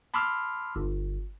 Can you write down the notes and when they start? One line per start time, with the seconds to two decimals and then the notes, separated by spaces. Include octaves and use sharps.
0.14 A5 B5 C6 D6 E6 F6
0.76 G1